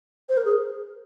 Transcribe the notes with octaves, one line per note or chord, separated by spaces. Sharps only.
C5
A#4
G#4